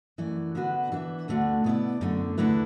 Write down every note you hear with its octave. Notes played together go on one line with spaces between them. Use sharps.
F#2 E3 A3 E4 D5
D3 B3 D4 F#4 B4
E3 D4 B4 E5
D2 D3 A3 D4 F#4
B2 B3 E4 D5
F#2 D3 A3 D4
E2 D3 A3 E4 B4